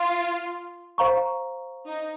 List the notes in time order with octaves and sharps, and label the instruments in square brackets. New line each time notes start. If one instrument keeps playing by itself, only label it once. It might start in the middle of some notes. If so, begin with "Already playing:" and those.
Already playing: [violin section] F4
[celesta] C5 F5 A#5 C#6
[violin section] D#4